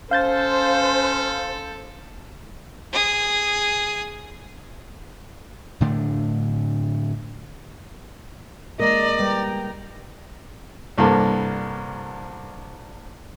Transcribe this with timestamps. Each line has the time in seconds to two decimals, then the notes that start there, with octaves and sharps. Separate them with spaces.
0.11 C#4 A4 C5 F5 G6 A6
2.92 G#4 D#6
5.80 A2 D3 A3 D4
8.80 G#3 A#3 A#4 D5 D#5 A#5
9.20 G3 B4 G5 A#5
10.98 C2 G2 A#3 A4